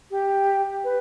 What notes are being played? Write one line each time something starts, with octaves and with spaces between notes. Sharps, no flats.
G4
B4